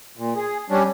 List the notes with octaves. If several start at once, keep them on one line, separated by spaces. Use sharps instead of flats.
A#2
G#4
G3 C#4 D4